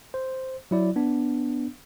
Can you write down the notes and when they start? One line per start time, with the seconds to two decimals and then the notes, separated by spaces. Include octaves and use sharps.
0.14 C5
0.71 F#3 E4 D5
0.96 B3 D4